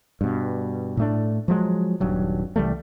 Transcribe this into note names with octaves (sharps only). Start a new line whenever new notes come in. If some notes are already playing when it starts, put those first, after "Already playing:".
G2 B2
A2 A3 D4
F3 F#3 G#3
D#1 G2 F#3
C2 E3 G3 A3